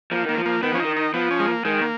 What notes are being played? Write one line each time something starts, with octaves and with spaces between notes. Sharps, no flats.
F3 A#3
D#3 A#3
F3
A#3
D#3 B3
F3 C#4
D#3 D#4
D#4
F3 B3
C#4
G#3
A#3
D#3 G#3
A#3